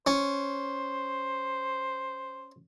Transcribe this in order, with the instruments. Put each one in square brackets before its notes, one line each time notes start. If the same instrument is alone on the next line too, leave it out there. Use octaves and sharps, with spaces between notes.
[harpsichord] C#4 [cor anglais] C5